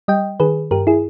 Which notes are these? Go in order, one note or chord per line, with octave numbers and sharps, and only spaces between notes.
G3 D#5 G5
D#3 G#4 B4
G2 G4 A#4
E4 G#4